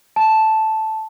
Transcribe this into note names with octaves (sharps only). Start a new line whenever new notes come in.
A5